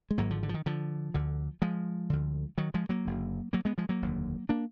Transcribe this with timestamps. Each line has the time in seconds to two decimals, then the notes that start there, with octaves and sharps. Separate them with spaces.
0.11 G#3
0.18 G#1 G#2 F#3 A#3
0.30 D3 F3
0.43 D3
0.49 F3
0.54 D#3
0.66 D3 F3
1.14 D2 D3
1.62 F3 G#3
2.10 D2 D3
2.58 D#3 F#3
2.74 F3 G#3
2.89 F#3 A#3
3.05 F#1 F#2 D3
3.53 F#3 A#3
3.65 G#3 B3
3.78 F3 G#3
3.89 F#3 A#3
4.02 F1 D#2 D3
4.49 A#3 D4